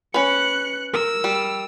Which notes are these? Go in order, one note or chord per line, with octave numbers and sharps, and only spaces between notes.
C#4 B4 F#6 C#7
A#4 E6
G3